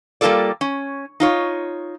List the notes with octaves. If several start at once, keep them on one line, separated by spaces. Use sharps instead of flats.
G3 A#3 D#4 F4 A4 D5
C#4
D#4 F4 C#5